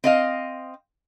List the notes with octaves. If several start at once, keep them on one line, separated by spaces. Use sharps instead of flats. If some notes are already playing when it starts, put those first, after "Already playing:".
C4 D#5 F5